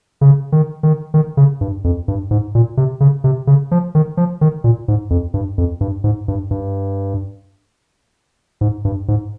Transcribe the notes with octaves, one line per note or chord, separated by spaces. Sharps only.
C#3
D#3
D#3
D#3
C#3
G2
F2
G2
G#2
A#2
C3
C#3
C3
C#3
F3
D#3
F3
D#3
A#2
G#2
F2
G2
F2
G2
G#2
G2
G2
G#2
G2
G#2